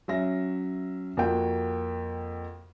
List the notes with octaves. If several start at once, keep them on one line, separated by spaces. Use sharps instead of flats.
F#3 C#4 E5 A#6
F2 A#3 F#4 G5